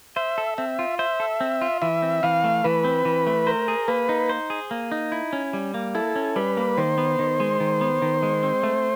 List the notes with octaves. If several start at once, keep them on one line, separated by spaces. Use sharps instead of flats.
C5 E5
A4
C4 E5
F4
C5 E5
A4
C4
F4
E3 E5
C4
E3 F5
A3
E3 B4
C4
E3
A3
A#4 C5
G#4
A#3 B4
D#4
C5
G#4
A#3
D#4
E4
C#4
G3
A#3
E4 A4
C#4
G3 B4
A#3
D#3 C5
B3
D#3
G#3
D#3
B3
D#3
G#3
C4
A3